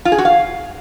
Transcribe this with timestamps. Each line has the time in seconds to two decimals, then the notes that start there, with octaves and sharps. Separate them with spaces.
0.05 F4
0.12 G#4
0.18 F#4
0.25 F5